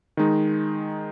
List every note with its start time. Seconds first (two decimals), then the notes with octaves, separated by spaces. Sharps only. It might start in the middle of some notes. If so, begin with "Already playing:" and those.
0.17 D#3 G#3 D#4